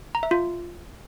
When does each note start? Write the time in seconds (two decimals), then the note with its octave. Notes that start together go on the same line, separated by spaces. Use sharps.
0.15 A#5
0.23 E5
0.31 F4